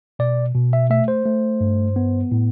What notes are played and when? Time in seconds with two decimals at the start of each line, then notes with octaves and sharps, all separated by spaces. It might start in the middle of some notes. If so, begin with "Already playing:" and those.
0.19 B2 D5
0.55 B2
0.73 E5
0.90 A3 E5
1.08 C5
1.25 A3
1.61 G2
1.96 B3
2.32 A2